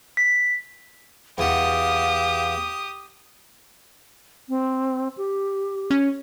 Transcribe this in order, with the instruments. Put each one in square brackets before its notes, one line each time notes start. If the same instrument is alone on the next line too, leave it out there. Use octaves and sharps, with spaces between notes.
[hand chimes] B6
[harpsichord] E2 F#4 [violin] G4 D#6 [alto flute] F5
[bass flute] C4
G4
[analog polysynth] C#4